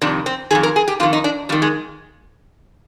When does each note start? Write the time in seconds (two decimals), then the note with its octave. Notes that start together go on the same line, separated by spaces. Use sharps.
0.01 F2 C3 D#3 D4
0.26 C4
0.51 C3 D#3 G#4
0.55 F2
0.63 A#4
0.76 G#4
0.88 G4
1.00 F2 F4
1.03 D#3
1.13 D#4
1.24 D4
1.49 F2 G3
1.52 D#3
1.62 G#3